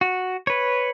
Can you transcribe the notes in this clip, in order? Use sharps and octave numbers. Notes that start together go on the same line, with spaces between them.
F#4
B4 C#5